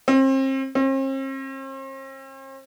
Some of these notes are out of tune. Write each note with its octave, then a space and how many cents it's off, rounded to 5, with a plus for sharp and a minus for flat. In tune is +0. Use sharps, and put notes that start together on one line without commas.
C4 +35
C4 +45